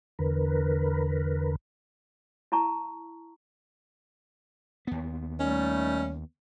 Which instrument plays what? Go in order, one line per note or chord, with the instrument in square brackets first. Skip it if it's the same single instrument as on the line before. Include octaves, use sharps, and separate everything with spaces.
[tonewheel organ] E2 D3 A#4 B4
[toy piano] E4 A5 A#5 C#6
[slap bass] D#2 B3
[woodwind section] D#3 G3 A3 [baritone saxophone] C#4